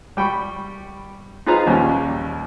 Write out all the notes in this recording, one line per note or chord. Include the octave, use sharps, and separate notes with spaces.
G3 G5 B5 C#6
D#4 F4 G#4 B4 C5 A#5
A#1 D#2 G3 C#4